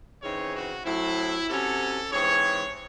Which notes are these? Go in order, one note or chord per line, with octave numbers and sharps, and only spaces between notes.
C#3 E3 C4 D#4 C#5
F#4
A2 F#3 C4 E4
C3 F#3 C#4 A4
G#2 E3 C4 C#5